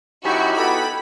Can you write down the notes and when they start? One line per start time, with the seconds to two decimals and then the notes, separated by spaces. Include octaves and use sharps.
0.25 F#2 D#4 E4 F#4 G4
0.56 B3 F#4 A4 B5